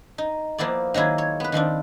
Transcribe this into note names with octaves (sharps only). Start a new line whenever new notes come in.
D#4
F3 A#3 B3 E4 D5
D#3 F#3 A#3 E4 G#4
C#5
B3 B4
D#3 F3 C4 D4